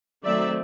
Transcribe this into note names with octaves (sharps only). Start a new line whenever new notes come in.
D#3 F#3 A3 C4 D5 E5